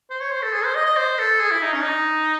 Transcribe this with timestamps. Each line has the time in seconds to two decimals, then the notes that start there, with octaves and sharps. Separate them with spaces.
0.10 C5
0.21 C#5
0.32 C5
0.42 A4
0.53 G#4
0.64 C5
0.75 D#5
0.86 D#5
0.97 C5
1.19 A4
1.40 G#4
1.51 E4
1.62 D#4
1.73 C#4
1.84 D#4